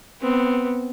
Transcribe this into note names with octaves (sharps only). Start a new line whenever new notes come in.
B3 C4